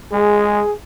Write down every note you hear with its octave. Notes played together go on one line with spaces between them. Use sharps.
G#3 G#4